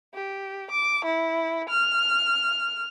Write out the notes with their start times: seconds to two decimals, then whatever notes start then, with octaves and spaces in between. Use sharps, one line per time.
0.14 G4
0.71 D6
1.05 E4
1.69 F6